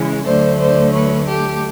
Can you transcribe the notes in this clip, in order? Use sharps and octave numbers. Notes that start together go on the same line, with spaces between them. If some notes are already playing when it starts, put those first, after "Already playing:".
Already playing: C#3 E3 G#3
D2 D3 F#3 A3 C5 D5
C5 D5
B4 C#5
G4 A4